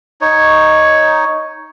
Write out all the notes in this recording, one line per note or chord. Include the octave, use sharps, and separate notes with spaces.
D#4 C#5